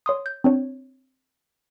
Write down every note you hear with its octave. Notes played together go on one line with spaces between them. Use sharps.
C#5 C6 D#6
G6
C4 D4 C#5